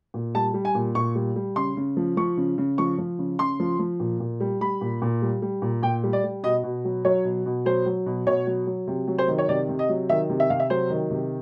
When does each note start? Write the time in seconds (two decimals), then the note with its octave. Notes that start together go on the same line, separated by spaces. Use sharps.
0.14 A#2
0.35 G3 A5
0.54 G3
0.65 G#5
0.75 A#2
0.95 A#2 C#6
1.15 G3
1.36 G3
1.56 C#3 C6
1.77 C#3
1.97 F3
2.17 F3 C#6
2.37 C#3
2.58 C#3
2.78 F3 C#6
2.98 F3
3.19 C#3
3.39 C#3 C6
3.60 F3
3.79 F3
4.00 A#2
4.20 A#2
4.40 G3
4.61 G3 B5
4.81 A#2
5.02 A#2
5.22 G3
5.42 G3
5.62 A#2
5.83 A#2 G5
6.03 G3
6.13 D5
6.24 G3
6.43 B2 D#5
6.63 B2
6.85 F#3
7.05 F#3 C#5
7.25 B2
7.46 B2
7.65 F#3 C5
7.86 F#3
8.06 B2
8.26 B2 C#5
8.47 F#3
8.67 F#3
8.87 C3
9.08 F#3
9.18 C5
9.28 D#3
9.38 C#5
9.49 C3 D5
9.69 C3
9.79 D#5
9.89 F#3
10.09 D#3 E5
10.30 C3
10.40 E5
10.50 C3 F5
10.60 E5
10.70 F#3 C5
10.90 D#3
11.10 C3